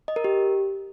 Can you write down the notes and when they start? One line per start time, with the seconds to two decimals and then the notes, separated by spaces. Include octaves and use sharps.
0.08 D#5
0.16 A#4
0.24 G4